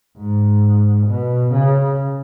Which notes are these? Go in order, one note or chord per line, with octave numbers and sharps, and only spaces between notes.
G#2
B2
C#3